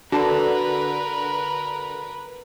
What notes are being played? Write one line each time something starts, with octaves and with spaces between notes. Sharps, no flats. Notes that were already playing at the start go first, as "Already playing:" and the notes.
D3 F#4 A#4 B4 A5